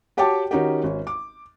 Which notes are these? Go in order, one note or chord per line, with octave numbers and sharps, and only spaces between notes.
F#4 G4 C#5 G5 A5 D6
D#3 C#4 D#4 F#4 G4
G#1 C#4
D6